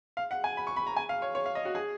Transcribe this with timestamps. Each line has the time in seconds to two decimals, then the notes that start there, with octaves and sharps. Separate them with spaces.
0.17 F5
0.31 F#5
0.44 G#5
0.57 B5
0.67 C#6
0.76 B5
0.87 A#5
0.97 G#5
1.09 F5
1.22 C#5
1.35 C#5
1.46 F5
1.55 D#5
1.65 F#4
1.75 G#4